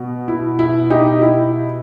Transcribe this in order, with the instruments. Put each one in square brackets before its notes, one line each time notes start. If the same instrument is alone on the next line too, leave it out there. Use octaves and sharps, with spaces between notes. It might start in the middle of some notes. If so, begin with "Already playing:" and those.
Already playing: [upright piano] B2
E4
E4
D#4 G4
E4